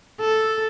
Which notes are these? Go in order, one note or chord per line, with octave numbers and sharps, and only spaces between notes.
A4